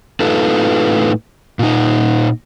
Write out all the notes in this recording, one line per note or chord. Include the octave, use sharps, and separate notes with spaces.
A2 D#4 F4 A4 B4
A#2 D#4